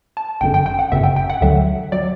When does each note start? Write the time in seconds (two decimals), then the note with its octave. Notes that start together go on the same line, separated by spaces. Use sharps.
0.17 A5
0.41 G1 F#2 D3 G5
0.54 G5
0.66 G5
0.79 F#5
0.92 G1 F#2 C#3 E5
1.04 G5
1.16 G5
1.30 F#5
1.41 D2 D3 F#3 E5
1.92 F#3 D5